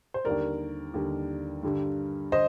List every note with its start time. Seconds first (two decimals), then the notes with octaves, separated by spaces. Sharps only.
0.14 C5
0.25 D#2 D3 G3 A#4 D5
0.94 D#2 D3 G3
1.63 G2 D3 G3
2.32 C5 D#5